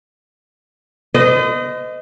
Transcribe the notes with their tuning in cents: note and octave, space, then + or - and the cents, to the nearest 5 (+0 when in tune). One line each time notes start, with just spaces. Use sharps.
C5 -45 D#5 +0